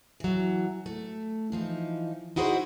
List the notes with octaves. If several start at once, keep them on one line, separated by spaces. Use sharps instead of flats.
E3 F#3
A3
E3 F3 D#4
D#4 E4 F#4 G#4 A#4 C5